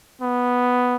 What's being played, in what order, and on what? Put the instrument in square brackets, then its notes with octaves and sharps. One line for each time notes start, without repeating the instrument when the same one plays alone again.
[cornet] B3